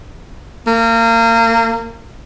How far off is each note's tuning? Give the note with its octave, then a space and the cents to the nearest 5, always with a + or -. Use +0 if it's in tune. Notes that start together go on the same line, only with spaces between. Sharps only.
A#3 -30